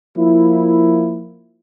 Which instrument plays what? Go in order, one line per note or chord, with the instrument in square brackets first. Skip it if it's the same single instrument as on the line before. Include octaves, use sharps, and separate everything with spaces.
[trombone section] F3 A#3 E4